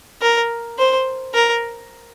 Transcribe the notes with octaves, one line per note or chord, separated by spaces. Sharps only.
A#4
C5
A#4